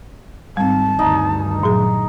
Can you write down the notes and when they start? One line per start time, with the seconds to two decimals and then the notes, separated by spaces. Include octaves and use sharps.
0.57 G#2 D#3 G3 C4 A5
0.99 D2 G2 D#3 D#4
1.63 A#2 F#3 G#4